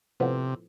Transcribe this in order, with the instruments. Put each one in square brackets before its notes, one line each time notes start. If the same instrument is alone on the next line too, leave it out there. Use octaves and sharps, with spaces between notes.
[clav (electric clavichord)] A2 F3 B3 [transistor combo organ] C3